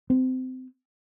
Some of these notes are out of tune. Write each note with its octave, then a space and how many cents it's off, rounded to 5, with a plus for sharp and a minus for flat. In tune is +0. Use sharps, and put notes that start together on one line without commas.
C4 -25